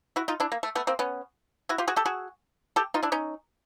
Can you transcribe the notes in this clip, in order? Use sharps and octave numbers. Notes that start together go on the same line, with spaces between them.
E4 F#4
D#4 F4
D4 E4
A#3
A3
A3 B3
A#3 C4
B3 C#4
E4 F#4
F4 G4
F#4 G#4
G4 A4
F#4 G#4
G4 A4
D#4 F4
D4 E4
C#4 D#4